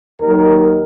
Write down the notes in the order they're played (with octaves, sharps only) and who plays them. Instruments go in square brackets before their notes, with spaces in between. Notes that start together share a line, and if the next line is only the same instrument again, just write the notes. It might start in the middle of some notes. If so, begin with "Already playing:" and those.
[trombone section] D#2 D#3 F#3 A#4